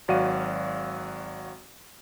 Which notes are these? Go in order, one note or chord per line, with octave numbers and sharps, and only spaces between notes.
G#1 F#3 F#4 D5 F5 D#7